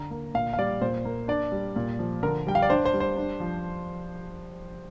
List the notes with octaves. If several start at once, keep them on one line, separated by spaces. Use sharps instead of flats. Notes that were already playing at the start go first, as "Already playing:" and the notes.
Already playing: D3 A#5
A#3
A#2 F5
F5
G3 D5
A#2 C5
A#3
D4 D5
G3
A#2
F3
D3 A#4
G3 G5
F5
D5
D4 C5
C5
G3
C5
D4
F3